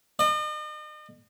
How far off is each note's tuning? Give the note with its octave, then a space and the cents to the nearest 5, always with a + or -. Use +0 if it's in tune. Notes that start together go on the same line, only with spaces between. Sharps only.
D#5 -40